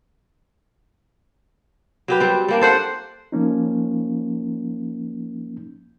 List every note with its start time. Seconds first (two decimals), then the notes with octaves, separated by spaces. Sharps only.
2.08 F#3 G4 B4
2.20 G3 C4
2.48 G3 A#3 D4
2.61 A4 C5 F#5
3.32 F3 A#3 C#4 D#4